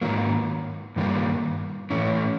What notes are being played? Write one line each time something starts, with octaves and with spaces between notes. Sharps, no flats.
G#2 D#3 F#3 A#3
G2 D#3 G3 A#3
A2 E3 A3 C#4 E4